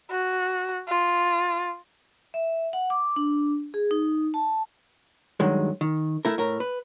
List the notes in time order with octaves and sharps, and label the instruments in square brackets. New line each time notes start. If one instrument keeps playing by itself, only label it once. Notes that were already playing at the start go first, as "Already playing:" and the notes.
[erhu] F#4
F4
[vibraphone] E5
F#5
D6
D4
G#4
D#4
A5
[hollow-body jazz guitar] G2 D#3 F#3 G#3
D#3
A3 E4 A#4
A2 A#4
B4